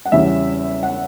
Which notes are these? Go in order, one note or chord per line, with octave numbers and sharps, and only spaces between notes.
F#5
E2 C#3 G3 C#4 E4 E5
F#5